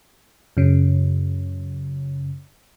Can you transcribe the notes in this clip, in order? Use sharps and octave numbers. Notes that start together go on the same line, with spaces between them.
F#2 C#3